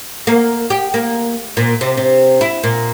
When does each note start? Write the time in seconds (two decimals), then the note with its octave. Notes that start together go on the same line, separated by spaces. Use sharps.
0.27 A#3
0.70 G4
0.94 A#3
1.57 A#2
1.81 C3
1.97 C3
2.41 E4
2.63 A#2